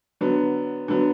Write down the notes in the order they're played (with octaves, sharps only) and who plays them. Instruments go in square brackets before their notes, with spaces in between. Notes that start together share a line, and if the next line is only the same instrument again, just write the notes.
[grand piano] D3 F#3 B3
D3 F#3 B3